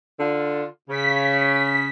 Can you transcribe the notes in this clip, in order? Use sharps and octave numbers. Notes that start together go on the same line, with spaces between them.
D3 F4
C#3 B6